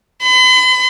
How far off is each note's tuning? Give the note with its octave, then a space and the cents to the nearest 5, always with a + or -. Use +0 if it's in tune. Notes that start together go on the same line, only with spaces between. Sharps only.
B5 +45